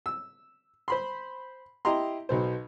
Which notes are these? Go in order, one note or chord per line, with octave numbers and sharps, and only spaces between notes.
E6
C5 B5 C6
E4 G4 D#5 A#5 C6
B1 B2 C5